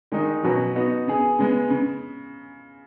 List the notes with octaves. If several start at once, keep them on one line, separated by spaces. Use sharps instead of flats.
D#3 G#3 D#4
B2 F#3 C#4 F#4 B4
B3 D#4 F#4
C#3 B3 G#4
C#3 G#3 B3
C#3